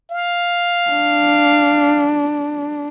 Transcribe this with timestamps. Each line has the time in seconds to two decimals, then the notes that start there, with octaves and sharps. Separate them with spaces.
0.10 F5
0.91 D4